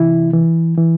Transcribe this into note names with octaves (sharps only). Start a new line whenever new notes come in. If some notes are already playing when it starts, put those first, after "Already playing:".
Already playing: C3 E3 E4
E3
E3